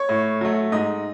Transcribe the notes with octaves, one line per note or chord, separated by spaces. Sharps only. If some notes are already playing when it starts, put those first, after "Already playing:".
Already playing: C#5 C#6
A2
F#3 A3
G#2 D#5 D#6